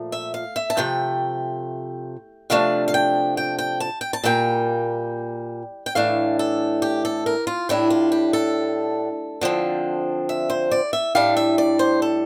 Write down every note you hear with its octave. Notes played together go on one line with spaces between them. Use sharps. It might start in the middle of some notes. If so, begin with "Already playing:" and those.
Already playing: A#2 F3 A3
E5
F5
E5
A5
C3 F3 A3 G5
C3 F3 A3 D4 F5
F5
G5
G5
G5
A5
G5
A5
A#2 G3 A#3 G5
G5
A2 E3 A3 D4 F5
A4
G4
A4
A#4
F4
A2 G3 D4 E4
F4
G4
A4
D3 F3 C4
E5
C5
D5
E5
A2 G3 D4 F5
E5
D5
C5
A4